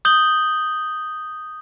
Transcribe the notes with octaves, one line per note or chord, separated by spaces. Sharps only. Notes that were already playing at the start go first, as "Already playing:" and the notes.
D#6 G6 F#7 G7